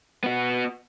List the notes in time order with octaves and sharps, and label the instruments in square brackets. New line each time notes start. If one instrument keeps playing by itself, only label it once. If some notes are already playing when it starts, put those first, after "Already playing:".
[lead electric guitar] B3 F#4